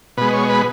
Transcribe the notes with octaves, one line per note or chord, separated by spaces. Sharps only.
B2 G#3 B4
C#5
B4